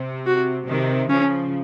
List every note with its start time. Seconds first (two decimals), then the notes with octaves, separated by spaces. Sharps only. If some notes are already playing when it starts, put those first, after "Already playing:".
Already playing: C3
0.27 F#4
0.68 C3 D#3
1.10 C#3 F3 C#4